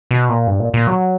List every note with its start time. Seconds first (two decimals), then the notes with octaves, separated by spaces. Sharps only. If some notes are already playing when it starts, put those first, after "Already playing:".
0.11 B2
0.29 A#2
0.47 G2
0.60 A#2
0.74 A#2
0.87 F#3